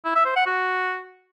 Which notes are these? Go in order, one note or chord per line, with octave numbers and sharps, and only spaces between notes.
E4
E5
C5
F#5
F#4